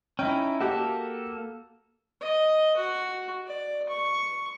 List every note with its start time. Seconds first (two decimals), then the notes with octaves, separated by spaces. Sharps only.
0.19 C#4 D#4 E4 G5
0.60 A#3 F#4 G4 A4
2.21 D#5
2.77 F#4
3.47 D5
3.89 C#6